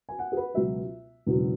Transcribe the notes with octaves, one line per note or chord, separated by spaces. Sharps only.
G#5
F#5
G#4
B4
C#2 B2 F#3 E5
E1 E2 C#3 F#3